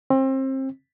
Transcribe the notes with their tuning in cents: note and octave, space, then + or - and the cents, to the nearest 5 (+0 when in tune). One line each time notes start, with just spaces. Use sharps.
C4 +30